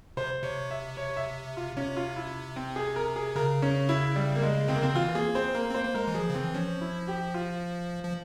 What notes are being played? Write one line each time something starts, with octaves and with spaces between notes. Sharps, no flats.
C3 C5
C3 C#5
E5
C#5
E5
F4
C3 C#4
F4
E4
C4
G#4
A#4
G#4
C#3 A#4
C#4
E4
G3
A#3
G#3
C3 C4
A#3
C#3 C4
E3 F4
A#3 G#4
C4 C5
A#3 A#4
C4
A#3 C5
A#3
G#3 A#4
E3
F3 G#4
C#3
E3 C4
F3 C#4
E4
G4
F4
F3